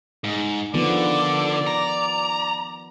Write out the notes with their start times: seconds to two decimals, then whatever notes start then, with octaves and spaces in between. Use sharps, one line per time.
0.24 G#2
0.74 D3 D#3 F3 B3 D5
1.67 A#5